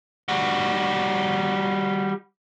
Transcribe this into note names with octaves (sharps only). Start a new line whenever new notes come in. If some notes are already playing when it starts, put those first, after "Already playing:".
G3 F#4